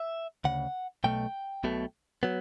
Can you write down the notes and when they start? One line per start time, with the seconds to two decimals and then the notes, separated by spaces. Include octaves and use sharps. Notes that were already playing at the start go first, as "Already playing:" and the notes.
Already playing: E5
0.44 D2 C#3 F#5
1.04 B1 B2 A3 G5
1.64 B1 B2 A3
2.23 F#3 B3